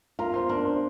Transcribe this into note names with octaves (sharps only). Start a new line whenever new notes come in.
F4 A#4 A#5
C5 C6
D4 A#4 A#5
C5 C6